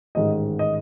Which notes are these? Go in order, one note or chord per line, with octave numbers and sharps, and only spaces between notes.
A1 G#2 D#3 G#3 D#5
D#5